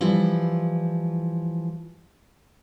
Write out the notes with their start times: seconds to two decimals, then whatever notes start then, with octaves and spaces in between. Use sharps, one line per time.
0.01 E3 F3 G3 E4